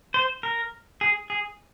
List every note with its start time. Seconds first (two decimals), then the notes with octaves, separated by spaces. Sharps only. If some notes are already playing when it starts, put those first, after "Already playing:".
0.14 C5
0.43 A#4
1.01 G#4
1.30 G#4